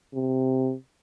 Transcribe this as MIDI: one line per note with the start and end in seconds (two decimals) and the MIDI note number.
0.14 0.74 48